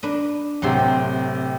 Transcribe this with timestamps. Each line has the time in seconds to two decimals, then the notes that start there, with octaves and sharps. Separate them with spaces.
0.03 D4 B4 D#5
0.62 D1 C3 F#3 G4 G5 C6